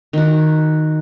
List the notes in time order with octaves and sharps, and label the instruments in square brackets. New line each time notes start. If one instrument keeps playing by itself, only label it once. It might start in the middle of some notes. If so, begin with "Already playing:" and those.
[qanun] D#3 F#4